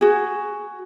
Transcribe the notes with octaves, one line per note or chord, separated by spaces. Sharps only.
F#4 G#4